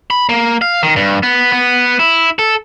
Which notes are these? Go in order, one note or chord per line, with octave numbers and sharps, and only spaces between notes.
B5
A#3
F5
D#3
G2
B3
B3
E4
A4